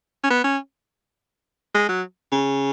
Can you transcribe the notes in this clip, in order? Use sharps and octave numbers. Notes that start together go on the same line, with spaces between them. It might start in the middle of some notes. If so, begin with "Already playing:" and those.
C#4
B3
C#4
G#3
F#3
C#3